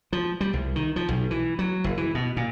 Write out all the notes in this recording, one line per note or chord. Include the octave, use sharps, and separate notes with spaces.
F3
G3
C2
D#3
F3
B1
E3
F#3
F#1
E3
B2
A#2